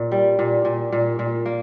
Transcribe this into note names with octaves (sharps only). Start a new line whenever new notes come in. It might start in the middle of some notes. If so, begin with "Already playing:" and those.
Already playing: A#2
G3
A#2
A#2
A#2
A#2
A#3